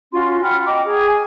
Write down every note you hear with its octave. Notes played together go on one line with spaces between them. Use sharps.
C#4 F4 F#4 C6
F#5 G5 B5 F6
D#5 G5 A#5 D6
G#4
G#5